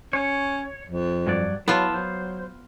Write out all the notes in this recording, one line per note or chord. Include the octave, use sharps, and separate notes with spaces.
C#4 C#5
F2
G2 F#3 D5
F#3 B3 E4 F4 A4 A5
F#3 C5